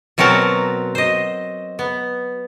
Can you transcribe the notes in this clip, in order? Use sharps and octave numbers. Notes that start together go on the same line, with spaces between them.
B2 F#3 C4 F#4 A#4 A5
C5 D#5
B3